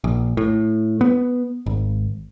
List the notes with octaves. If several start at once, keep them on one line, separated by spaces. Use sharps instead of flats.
A#1
A2
B3
G#1